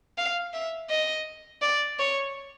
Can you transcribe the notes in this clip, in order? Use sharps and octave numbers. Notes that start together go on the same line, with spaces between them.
F5
E5
D#5
D5
C#5